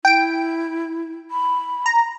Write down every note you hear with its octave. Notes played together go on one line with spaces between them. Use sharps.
E4 G5 D7
B5
A#5